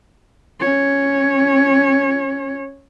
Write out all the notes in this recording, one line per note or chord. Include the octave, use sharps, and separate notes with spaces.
C#4 C#5